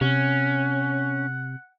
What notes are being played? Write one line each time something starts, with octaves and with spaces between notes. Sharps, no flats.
C3 C#4 F#5